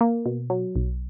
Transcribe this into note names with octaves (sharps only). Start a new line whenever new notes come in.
A#3
B2
F#3
B1